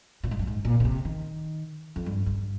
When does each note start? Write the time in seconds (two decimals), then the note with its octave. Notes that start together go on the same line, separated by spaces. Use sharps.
0.24 A#2
0.31 G#2
0.39 G2
0.47 G#2
0.65 A#2
0.80 C#3
0.85 C3
1.05 D#3
1.96 F2
2.06 G2
2.26 G2